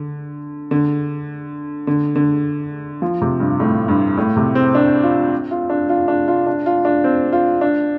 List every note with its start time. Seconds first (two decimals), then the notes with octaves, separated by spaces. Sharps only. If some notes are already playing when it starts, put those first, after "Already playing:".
Already playing: D3
0.71 D3
1.87 D3
2.16 D3
3.02 F3
3.22 C3
3.40 G2
3.60 A2
3.88 G2
4.17 A2
4.37 C3
4.55 C4
4.75 D4
5.03 F4
5.51 F4
5.70 D4
5.89 F4
6.08 D4
6.28 F4
6.47 D4
6.66 F4
6.85 D4
7.04 C4
7.33 F4
7.61 D4